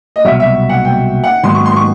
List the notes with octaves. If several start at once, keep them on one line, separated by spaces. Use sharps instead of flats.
D#5
C2 B2 F#3 E5
E5
F#5
G5
F#5
G#2 D#3 F#3 B3 C6
C#6
C6
C#6